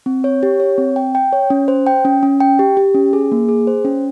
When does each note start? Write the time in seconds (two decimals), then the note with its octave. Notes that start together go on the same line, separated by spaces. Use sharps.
0.06 C4
0.24 C#5
0.43 G4
0.60 C#5
0.78 C4
0.96 G5
1.15 G5
1.33 C#5
1.50 C#4
1.68 C5
1.87 G5
2.05 C#4
2.23 C#4
2.40 G5
2.59 G4
2.77 G4
2.95 C#4
3.13 G#4
3.32 A#3
3.49 G#4
3.67 C5
3.85 C#4